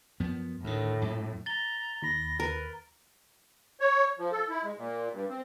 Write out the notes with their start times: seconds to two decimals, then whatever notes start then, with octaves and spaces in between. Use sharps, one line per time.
0.20 F#2 F3 B3
0.64 D2 A2 D#3
1.02 F#2 A#2
1.46 A#5 A6 G7
2.02 D#2 B5 A#6
2.40 A#4 B4
3.80 C#5
4.19 F3
4.32 A4
4.49 E4
4.63 G#3
4.77 A#2
5.12 G2
5.29 C4